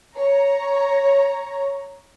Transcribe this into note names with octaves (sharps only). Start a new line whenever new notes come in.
C#5 A#5